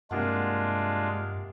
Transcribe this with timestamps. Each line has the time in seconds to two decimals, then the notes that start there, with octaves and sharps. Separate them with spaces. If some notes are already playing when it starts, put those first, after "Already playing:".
0.11 G2 C3 G#3 A#3 D4 F4 F#5